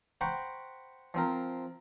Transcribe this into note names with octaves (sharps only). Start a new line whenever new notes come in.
C5 F#5 G5 A#5 B5 C#6
F3 C4 A#4